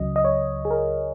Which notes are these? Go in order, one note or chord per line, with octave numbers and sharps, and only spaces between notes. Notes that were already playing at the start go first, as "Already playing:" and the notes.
Already playing: C#2 C#3 F#3 D#5
D#5
C#5
G#4
A#4